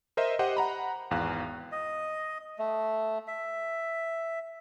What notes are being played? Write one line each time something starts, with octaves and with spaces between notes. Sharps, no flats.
A#4 C5 D#5 E5
G4 C5 D#5 F#5
F#5 A#5 B5
G#1 E2 F5 F#6
D#5
A3
E5